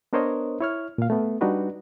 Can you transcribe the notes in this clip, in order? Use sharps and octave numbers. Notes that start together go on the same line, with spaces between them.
B3 D4 A#4 C5 C#5 D#5
E4 C#5 F6
A#2 F5
A3 B3
G3 D4 D#4 F#4 B4